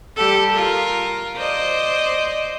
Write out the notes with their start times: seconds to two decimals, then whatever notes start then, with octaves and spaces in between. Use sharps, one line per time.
0.16 G3 G4 A4
0.53 F4 A#4
1.36 C5 D5 D#5